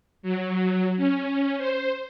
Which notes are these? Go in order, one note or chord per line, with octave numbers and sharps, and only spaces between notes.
F#3
C#4
C5